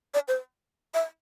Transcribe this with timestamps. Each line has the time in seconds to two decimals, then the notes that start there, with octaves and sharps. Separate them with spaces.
0.14 D5
0.28 C5
0.94 E5